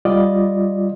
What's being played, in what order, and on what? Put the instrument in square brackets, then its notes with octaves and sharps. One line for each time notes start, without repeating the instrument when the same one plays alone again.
[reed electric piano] G3 F4 D5 D#5